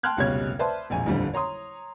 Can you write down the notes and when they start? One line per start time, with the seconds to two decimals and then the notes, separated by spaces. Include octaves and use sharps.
0.03 G5 A5 C6 F6 F#6 G#6
0.17 F1 C#2 B2 G3 C#5 G#6
0.59 B4 C5 D5 E5 A5 C6
0.90 E1 A#1 F2 G#5
1.06 D#1 A1 F2 D3 G3
1.34 C#5 A#5 C6 D#6